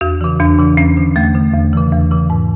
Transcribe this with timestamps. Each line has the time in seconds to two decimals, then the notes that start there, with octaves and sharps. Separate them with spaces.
0.01 E2 F#4
0.21 C#3 E3
0.40 E2 D4
0.58 C#3 E3
0.77 E2 C#4
0.97 D3
1.16 E2 A3
1.35 D3
1.54 E2
1.73 C#3 E3
1.92 E2
2.11 C#3 E3
2.30 G#2